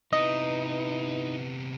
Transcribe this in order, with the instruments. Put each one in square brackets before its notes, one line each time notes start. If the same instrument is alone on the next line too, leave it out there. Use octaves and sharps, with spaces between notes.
[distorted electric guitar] C3 B3 [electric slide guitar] D#4 [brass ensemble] E4 B4 [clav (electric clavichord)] D#5